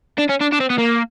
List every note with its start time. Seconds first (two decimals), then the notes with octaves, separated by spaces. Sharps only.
0.18 D4
0.29 C#4
0.41 D4
0.52 D4
0.60 C4
0.70 B3
0.78 A#3